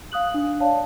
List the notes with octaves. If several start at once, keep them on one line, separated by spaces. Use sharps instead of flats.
F5 D#6 F#6 F#7
D4
C#5 D5 F5 A5